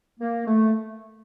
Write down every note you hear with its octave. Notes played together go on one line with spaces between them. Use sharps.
A#3
A3